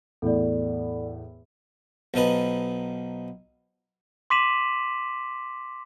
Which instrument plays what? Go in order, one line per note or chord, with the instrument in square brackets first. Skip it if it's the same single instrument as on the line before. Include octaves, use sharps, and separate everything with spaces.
[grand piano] E2 A2 [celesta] A4 D5
[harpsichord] B1 F3 D#4 B4
[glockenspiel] C6 D6 B6 D#7 E7 F#7